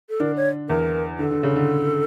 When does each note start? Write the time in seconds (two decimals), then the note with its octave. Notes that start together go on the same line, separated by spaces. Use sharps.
0.10 A4
0.20 D3 D4 A#4
0.37 C#5
0.69 E2 E3 A#4
1.19 D3 A4
1.31 D3
1.43 C#3
1.56 D3